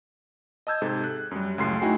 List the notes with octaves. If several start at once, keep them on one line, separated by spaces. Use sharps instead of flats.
D#5 A5 E6 G6 G#6
G#2 C3 A4
F#6
F#2 G3
C#2 F#2 A2 C6 C7
A3 D#4 E4 F#4 G5 G#5